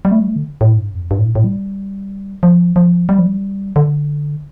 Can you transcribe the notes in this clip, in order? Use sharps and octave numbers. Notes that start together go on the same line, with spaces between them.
G3
A3
G3
A3
D3
A2
G2
F2
G2
A2
A#2
A2
G3
F3
F3
G3
F3
G3
D3